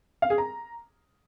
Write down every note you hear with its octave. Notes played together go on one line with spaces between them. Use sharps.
F5
G#4
A#5